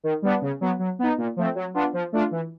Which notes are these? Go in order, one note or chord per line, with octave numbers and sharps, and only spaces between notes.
D#3
G3 B3 D4
C#3
F#3 B3
F#3
B3 D#4
A#2
F3 A3 C4
F#3
B3 D4 F4
F3
A3 D4 F4
E3